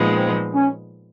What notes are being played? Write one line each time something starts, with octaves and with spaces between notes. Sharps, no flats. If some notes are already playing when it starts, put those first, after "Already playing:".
Already playing: A#2 F3 G#3 B3 D#4
C4
C#4